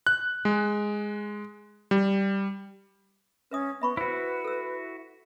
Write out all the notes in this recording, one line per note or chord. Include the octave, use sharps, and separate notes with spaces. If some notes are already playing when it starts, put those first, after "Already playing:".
F#6
G#3
G3
C#4 B4 E5 D#6
B3 E5 B5 C#6
E4 F#4 B4 C5
A4 E6